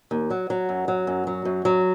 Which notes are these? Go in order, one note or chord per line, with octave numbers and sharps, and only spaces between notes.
D#2
F#3
F#3
F#2
F#3
F#2
F#3
F#2
F#3